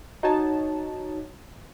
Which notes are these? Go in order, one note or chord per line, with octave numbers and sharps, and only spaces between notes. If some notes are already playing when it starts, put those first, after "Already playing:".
D#4 F#4 C#5 A5